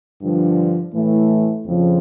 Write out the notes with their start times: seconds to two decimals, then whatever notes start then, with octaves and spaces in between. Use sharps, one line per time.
0.21 G2 D3 F3
0.93 A2 E3 A3
1.65 F2 C#3 F3